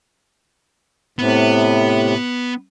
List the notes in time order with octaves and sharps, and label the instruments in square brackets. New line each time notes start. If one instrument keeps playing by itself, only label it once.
[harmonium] A2 C3 [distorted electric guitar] B3